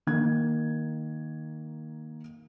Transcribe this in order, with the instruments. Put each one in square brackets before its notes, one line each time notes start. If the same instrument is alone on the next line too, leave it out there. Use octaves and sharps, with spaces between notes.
[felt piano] D#3 A#3 G#6